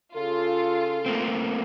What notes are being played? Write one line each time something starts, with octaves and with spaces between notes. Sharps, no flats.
C#3 F4 A4
A3 A#3 C4